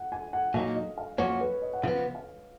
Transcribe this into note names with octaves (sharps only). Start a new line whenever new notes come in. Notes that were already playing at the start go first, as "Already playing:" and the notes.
Already playing: F#5
G#5
F#5
A#2 F#3 A#3 D#4 F5
D#5
F5
F#2 F3 A#3 C#4 F#4 C#5
B4
D#5
F#5
C#3 F3 B3 F5
F5